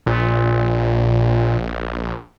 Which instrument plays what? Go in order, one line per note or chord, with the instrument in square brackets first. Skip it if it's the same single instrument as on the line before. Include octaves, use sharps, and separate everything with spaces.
[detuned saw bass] A#1 [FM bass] A#2